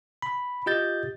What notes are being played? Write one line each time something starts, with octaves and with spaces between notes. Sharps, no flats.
B5
F4 G4 D#5 G6 A6